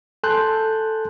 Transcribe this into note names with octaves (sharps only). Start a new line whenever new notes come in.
A4 G#5 A5 C6 F#6 G6